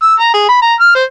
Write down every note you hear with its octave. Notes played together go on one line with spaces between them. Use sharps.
E6
A#5
G#4
B5
A#5
F6
C5